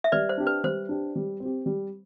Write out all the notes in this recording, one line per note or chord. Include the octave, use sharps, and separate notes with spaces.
E5
G3 B4 D5
C5
D4 G4
B4
G3 C5
D4 G4
G3
C4
G4
G3